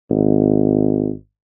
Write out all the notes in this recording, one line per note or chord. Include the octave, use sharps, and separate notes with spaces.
G#1